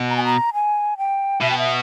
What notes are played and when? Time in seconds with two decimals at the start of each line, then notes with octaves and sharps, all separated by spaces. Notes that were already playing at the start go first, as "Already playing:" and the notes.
Already playing: B2
0.10 A#5
0.17 G#5
0.25 A#5
0.54 G#5
0.98 G5
1.41 B2 E5
1.50 G5
1.58 E5